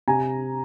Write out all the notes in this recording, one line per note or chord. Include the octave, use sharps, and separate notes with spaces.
C3 G#5 A#5